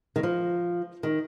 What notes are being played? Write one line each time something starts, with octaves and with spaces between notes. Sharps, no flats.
D#3
F3
D#3